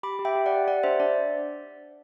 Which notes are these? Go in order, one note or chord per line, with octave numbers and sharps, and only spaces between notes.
G4 B5 D6
G4
E5 G5
G4
D5 F#5
G4
G4 D5 F#5
D4 C5 E5
D4 D5